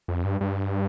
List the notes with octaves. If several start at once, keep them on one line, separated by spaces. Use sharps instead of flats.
F2
G2
G2